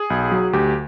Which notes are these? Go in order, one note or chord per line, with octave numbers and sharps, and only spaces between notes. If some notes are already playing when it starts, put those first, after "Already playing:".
Already playing: G#4
B1
F#3
D2 G4